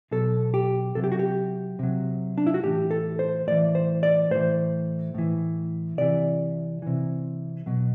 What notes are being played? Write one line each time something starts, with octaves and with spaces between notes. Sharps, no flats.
B2 F#3 A4
G4
C3 F#3 A4
G4
F#4
G4
C3 F#3
D4
E4
F#4
A2 E3 G4
A4
C5
A2 E3 D5
C5
D5
A2 E3 C5
A2 E3
C3 E3 D5
C3 E3
B2 F#3